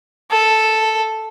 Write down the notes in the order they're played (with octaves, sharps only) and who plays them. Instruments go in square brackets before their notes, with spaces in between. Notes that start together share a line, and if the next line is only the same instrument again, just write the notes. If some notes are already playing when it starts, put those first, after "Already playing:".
[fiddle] A4